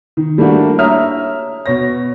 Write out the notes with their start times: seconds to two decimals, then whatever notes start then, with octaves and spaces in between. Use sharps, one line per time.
0.17 D#3
0.38 G3 A3 A#3 D4 F#4
0.79 C#5 E5 A#5 D#6 F6
1.66 B2 C#5 A#6